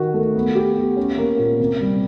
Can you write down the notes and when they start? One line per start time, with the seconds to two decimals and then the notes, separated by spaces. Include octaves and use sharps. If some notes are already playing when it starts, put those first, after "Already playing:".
Already playing: D#3 F#4 A#4
0.14 A3
0.35 B3
0.55 G4
0.77 B3
0.97 C#4
1.18 A#3
1.39 A#2
1.60 C3
1.81 G3